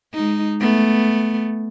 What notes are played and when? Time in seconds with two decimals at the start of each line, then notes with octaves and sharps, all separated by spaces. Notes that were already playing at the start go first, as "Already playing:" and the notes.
0.14 G#3 D#4
0.60 A3 B3